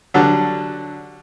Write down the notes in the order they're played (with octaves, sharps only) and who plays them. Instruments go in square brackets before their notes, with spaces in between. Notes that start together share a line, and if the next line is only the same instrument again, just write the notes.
[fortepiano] D3 F#3 G3